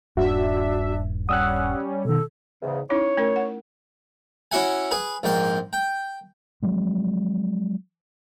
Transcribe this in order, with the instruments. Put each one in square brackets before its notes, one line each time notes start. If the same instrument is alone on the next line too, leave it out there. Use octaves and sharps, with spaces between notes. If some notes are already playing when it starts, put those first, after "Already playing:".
[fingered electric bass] D#1 G2 [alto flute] D4 [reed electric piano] F#4 [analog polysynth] E5
[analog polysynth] G3 C#4 [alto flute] F#5 [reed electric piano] D#6 E6 F#6
[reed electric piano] B2 D#3 [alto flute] A4
[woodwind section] E2 G#2 C#3
[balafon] C#4 D#4 E4 [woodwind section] C#5
[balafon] A3 C#4 A#4
F#5
[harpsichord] C#4 E4 F#4 E5 F#5 G#5
G#4 B4
A#1 G#2 G5 C6
G5
[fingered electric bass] F3 F#3 G#3 C4